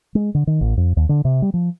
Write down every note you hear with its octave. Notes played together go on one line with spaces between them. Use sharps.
G#3
D3
D#3
A1
F2
D#2
D3
C3
G3
F3